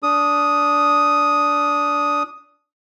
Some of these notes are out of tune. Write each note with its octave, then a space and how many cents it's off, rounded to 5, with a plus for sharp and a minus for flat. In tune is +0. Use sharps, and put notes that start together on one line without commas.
D4 -20 D#6 +0